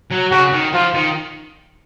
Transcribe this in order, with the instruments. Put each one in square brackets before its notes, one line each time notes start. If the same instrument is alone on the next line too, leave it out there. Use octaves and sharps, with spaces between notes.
[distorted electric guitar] F#3
[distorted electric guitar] C#3 [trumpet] F#4
[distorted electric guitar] D#3
[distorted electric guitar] F3 [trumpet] F4
[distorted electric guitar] D#3